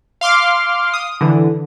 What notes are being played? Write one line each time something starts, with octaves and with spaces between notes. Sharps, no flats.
F5 C6 D6 F6
D#6
D3 E3